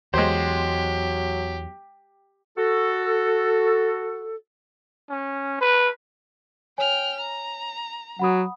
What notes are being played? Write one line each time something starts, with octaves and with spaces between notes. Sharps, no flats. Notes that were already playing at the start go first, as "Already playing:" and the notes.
E2 F#3 G#3 G4 C5
F#4 A4
C#4
B4
C#5 G5 G#5 F6
A#5
F#3 F#5 B5 D#6